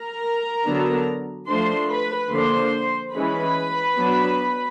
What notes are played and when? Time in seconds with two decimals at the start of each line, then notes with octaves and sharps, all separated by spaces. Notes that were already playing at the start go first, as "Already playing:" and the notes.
Already playing: A#4 A#5
0.66 D3 F#3 B3 D4
1.49 F3 A3 D4 C5 C6
1.90 B4 B5
2.32 D3 F3 A#3 D4 C5 C6
3.14 E3 G#3 C#4 B4 B5
3.97 F#3 B3 D4